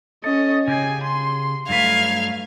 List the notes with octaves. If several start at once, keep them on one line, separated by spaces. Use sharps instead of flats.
C#4 A4 D#5
C#3 G4 G#4 G#5
C6
G2 F#3 A3 B4 F5 G#6